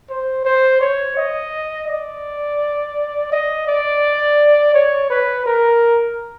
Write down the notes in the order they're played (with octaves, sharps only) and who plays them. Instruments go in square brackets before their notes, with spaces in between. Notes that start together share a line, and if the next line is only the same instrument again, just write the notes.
[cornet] C5
C5
C#5
D#5
D5
D#5
D5
C#5
B4
A#4